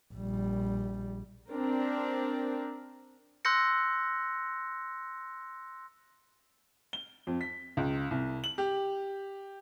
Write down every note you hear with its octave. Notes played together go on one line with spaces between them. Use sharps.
A#1 G3
C4 D4 A#4
C6 E6 F#6 G6 A#6 C#7
G7
F2
B6
C#2
C2
F#7
G4